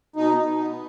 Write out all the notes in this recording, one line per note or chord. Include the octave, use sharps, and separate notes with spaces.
B2 D#4
B2
B3